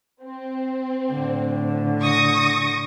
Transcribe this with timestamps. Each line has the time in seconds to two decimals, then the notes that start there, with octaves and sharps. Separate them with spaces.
0.24 C4
1.12 A2 D3
2.02 C#6 D#6 A#6